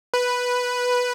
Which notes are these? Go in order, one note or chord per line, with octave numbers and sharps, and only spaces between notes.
B4